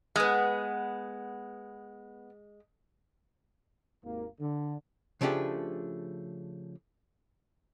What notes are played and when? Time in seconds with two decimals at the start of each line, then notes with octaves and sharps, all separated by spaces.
0.16 G#3 B3 G#4 F6
4.05 G#1 D#2 A#3
4.41 D3
5.21 C#3 F3 A3 D4 G4 G#4